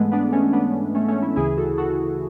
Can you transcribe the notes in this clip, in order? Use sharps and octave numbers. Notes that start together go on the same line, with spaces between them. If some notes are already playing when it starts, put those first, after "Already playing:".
Already playing: G#2 E3 G#3 A3 B3
B3 D4
A3 C#4
B3 D4
A3 C#4
A3 C#4
C#4 E4
D2 C#3 E3 E4 G#4
F#4 A4
F#4 A4